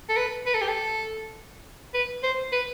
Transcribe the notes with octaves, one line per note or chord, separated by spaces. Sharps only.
A4
B4
B4
A4
G4
A4
B4
C5
B4